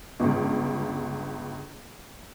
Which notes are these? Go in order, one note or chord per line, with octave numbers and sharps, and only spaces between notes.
G1 C#2